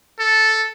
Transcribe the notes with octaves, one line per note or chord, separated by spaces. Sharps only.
A4